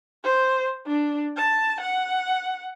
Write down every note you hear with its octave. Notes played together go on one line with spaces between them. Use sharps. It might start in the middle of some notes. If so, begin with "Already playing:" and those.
C5
D4
A5
F#5